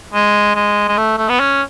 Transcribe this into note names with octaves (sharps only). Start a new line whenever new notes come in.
G#3
G#3
G#3
A3
A3
B3
C#4